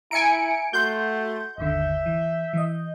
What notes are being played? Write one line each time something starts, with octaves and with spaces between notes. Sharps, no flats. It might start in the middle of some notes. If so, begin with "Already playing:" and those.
E4 E5 G#5 A#5 C#7 D7
A3 F#4 F#5 C6 G6
G1 D#2 D3 E5
E3
E3 D#5